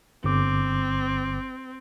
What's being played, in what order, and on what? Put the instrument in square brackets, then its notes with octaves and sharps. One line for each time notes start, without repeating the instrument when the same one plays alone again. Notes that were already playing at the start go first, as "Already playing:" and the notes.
[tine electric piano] G1 D6 [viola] C4